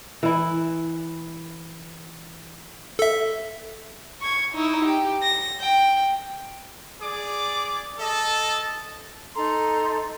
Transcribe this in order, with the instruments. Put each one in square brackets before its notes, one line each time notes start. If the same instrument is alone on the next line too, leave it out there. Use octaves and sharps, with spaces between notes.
[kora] E3 E4
[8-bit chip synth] A4 E5
[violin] C#6 G#6
D#4 E4
G4
A#6
G5
[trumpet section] G#4 D5 D6
A4 D#5 A5
[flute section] D#4 A4 A#5 C6